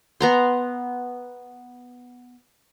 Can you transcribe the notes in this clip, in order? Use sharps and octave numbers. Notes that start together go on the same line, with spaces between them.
B3 A#5 C6